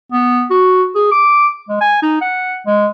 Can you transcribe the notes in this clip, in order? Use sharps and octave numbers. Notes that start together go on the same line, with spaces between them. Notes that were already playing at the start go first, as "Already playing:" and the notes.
B3
F#4
G#4
D6
G#3
G#5
D#4
F#5
G#3